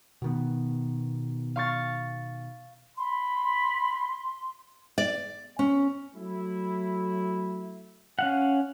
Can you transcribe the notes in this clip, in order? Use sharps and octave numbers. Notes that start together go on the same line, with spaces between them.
B2 D#3 B3
F5 C#6 A6
B5 C6
D5
C#4
F#3 A3 E4
C#4 F5 F#5